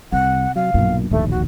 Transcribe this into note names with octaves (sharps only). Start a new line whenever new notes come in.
C2 C3 C4 F#5
F#3 F5
B1 G2 A#2 F#3
D1 A#1 D#2 A3
F#4